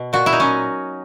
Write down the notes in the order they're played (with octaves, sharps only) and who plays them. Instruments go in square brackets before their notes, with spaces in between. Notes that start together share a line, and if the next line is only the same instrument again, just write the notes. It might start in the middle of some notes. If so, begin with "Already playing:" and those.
Already playing: [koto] B2
A#2 F#4
E4
D#4
F#3 C#4